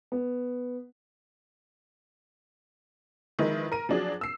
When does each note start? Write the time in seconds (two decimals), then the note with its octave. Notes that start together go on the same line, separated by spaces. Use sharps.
0.12 B3
3.39 D#3 F3 G#3 E4 B4
3.72 A#4 D#7
3.89 F3 F#3 D4 G#4
4.21 E6 C7